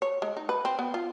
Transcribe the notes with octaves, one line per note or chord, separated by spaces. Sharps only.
C#5
G#3
D#4
B4
C4
B3
F4